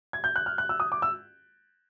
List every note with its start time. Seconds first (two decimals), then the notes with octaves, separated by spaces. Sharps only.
0.13 G#6
0.24 G6
0.36 F#6
0.46 F6
0.58 F#6
0.69 E6
0.80 D#6
0.92 D6
1.02 E6